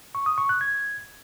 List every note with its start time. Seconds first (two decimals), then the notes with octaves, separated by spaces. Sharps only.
0.15 C#6
0.26 D#6
0.38 C#6
0.49 F#6
0.61 G#6